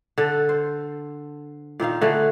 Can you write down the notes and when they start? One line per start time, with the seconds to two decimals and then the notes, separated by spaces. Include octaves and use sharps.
0.18 D3 A4
0.49 C5
1.80 A#2 D#3 D#4 F5
2.01 D3 A3 G#4 B4